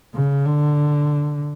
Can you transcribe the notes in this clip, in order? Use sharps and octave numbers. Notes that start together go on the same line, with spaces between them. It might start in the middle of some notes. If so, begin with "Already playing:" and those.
C#3
D3